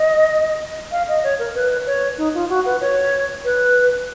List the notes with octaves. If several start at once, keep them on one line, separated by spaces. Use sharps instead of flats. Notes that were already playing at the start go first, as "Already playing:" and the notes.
Already playing: D#5
F5
D#5
C#5
A#4
B4
C#5
D#4
F4
F#4
B4
C#5
B4